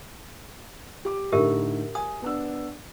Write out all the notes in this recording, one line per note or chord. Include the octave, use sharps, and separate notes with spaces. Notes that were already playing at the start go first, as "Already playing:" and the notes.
G4 D6
A2 D3 D#4 G4 A#4 E5
G#5 D#6
B3 D4 E6